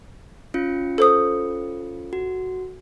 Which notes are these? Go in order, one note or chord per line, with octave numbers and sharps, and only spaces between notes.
C#4 F4 C#7
A4 C5 D#6
F#4